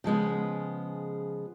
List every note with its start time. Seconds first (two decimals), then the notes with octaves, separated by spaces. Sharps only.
0.04 C#3 F3 G#3 B3